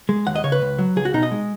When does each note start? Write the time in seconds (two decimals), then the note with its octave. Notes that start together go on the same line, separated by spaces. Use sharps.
0.09 G#3
0.27 D#2 F#5
0.36 D#5
0.44 C#3 C#5
0.52 B4
0.62 C#2
0.78 F#3
0.96 C#2 G#4
1.05 F#4
1.14 B2 D#4
1.23 D#5
1.31 G#3